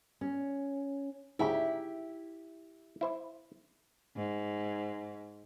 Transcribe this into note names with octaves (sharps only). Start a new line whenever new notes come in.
C#4
D2 G#2 C#3 E4 G4
E4 C5 E5
G#2